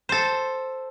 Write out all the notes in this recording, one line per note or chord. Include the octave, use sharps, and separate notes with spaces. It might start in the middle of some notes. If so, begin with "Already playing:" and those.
A4 C5